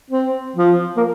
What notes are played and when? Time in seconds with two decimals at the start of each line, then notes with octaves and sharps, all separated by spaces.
0.11 C4
0.56 F3
0.97 A#3